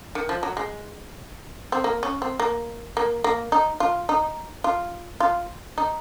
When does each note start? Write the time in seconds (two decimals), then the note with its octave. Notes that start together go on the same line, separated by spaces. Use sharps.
0.15 D#3
0.29 F3
0.43 F#3
0.57 G#3
1.72 C4
1.84 A#3
2.03 C#4
2.22 C4
2.40 A#3
2.97 A#3
3.24 A#3
3.52 D#4
3.80 F4
4.09 D#4
4.64 F4
5.20 F4
5.78 D#4